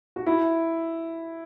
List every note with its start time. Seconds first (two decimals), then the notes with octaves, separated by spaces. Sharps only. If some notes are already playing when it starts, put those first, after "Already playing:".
0.16 F#4
0.26 E4